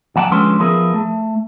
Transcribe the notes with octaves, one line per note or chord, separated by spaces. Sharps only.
E2 F#3 F#5 G5 A5
D3 F3 G#3 C#4 B4 C6
F3 B3 E4 G#4 A#4 B4
A3